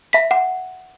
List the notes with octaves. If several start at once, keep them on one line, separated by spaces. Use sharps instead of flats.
E5 B6
F#5